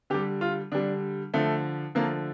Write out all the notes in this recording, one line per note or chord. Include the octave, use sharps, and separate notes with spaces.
D3 G3 G4
F4
D3 G3 D4
D3 F3 A3
D3 F3 A3 A#3